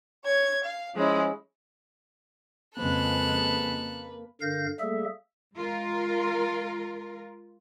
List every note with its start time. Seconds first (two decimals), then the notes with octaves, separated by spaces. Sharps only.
0.24 C#5 G#6
0.63 F5
0.95 F3 G#3 C#4 E4
2.77 F2 C#3 G#3 A#3 A4 B4 F#6
4.41 G2 D3 A#4 F5 G6 A#6
4.80 G3 A3 A#3 G#4 A4 E5
5.54 G#3 F4 A#4